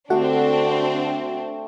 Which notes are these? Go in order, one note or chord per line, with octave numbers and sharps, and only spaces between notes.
D3 A3 C4 D4 F#4 G4 F#5